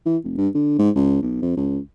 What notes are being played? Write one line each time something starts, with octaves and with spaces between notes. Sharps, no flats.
E3
F1
G2
D3
G#2
C#2
B1
F2
C#2